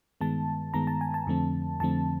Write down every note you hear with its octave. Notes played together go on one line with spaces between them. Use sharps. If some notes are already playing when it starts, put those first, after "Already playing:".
G2 D#3 G#3 B3 A5
G2 D#3 G#3 B3 A#5
A5
G#5
A5
F2 D3 F3 A3 C4
F2 D3 F3 A3 C4 A5